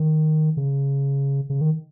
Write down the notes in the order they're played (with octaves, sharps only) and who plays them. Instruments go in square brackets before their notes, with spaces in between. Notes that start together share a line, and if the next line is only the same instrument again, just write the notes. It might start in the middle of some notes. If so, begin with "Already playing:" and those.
Already playing: [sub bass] D#3
C#3
C#3
D#3